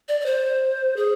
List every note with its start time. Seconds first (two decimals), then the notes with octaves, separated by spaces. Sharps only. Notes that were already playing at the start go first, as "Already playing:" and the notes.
0.09 D5
0.21 D5
0.26 C5
0.97 G#4